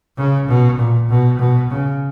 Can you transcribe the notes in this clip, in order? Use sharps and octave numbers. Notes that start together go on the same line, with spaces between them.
C#3
B2
A#2
B2
B2
C#3